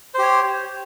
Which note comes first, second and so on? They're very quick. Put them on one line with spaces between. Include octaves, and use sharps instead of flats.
C5 G4 C#5